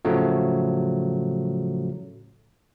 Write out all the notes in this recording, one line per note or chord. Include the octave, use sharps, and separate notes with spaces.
A2 C#3 F3 F#3 A3